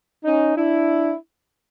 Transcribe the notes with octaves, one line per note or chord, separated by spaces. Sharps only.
C#4 D#4
D4 E4